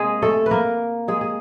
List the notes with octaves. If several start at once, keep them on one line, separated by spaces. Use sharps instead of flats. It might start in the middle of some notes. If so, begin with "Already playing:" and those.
Already playing: C3 G#3 A#3 G#4
A3 A4
B4
A#3 A#4
G#3 G#4
G#4